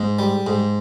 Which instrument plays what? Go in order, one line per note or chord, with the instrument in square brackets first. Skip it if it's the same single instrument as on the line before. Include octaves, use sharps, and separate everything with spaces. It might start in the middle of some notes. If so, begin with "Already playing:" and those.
Already playing: [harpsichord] G#2
G3
G#2